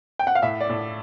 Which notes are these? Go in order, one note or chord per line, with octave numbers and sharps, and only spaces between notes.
G5
F#5
F5
A2 E5
D5
A2